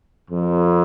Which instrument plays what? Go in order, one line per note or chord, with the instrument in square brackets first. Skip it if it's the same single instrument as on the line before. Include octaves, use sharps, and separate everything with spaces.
[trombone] F2